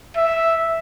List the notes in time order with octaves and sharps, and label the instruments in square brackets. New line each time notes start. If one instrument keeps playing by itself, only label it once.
[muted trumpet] E5